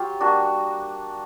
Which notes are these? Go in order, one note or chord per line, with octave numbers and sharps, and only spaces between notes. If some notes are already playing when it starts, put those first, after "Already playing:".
Already playing: F#3 F4 G4
G3 A#3 D4 F#4